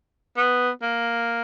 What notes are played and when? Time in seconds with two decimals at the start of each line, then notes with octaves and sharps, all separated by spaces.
0.37 B3
0.83 A#3